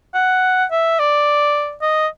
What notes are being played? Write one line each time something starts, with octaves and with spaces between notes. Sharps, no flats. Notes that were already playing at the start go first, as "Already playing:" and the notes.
F#5
E5
D5
D#5